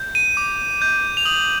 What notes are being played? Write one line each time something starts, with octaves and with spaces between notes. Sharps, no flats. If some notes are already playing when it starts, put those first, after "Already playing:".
Already playing: G6
D#7
D6
G6
F7
D#6 F#7